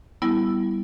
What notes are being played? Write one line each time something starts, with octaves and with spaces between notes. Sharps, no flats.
G3 B3 E4